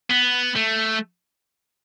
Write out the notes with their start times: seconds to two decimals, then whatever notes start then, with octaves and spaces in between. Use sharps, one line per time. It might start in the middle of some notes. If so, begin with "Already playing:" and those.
0.10 B3
0.56 A3